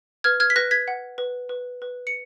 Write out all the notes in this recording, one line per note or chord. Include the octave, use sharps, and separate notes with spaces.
B4 F6 G#6
F6 G#6
B6
B4 F#6 A#6
G#6 B6
F#5
B4
B4
B4
C#7